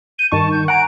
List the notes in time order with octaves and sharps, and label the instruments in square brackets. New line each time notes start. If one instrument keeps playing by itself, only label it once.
[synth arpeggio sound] G6 [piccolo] D#7
[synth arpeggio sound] G2 D#3 C#6 [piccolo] A5
[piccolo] G6
[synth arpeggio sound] F#5 G#5 A#5 [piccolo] D7